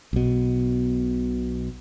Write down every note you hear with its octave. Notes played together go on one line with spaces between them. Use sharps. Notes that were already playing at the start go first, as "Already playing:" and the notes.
B1 B2